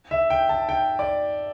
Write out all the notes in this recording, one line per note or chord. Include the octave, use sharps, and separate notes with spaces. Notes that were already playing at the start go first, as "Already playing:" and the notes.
E5
G5
A5
G5
D5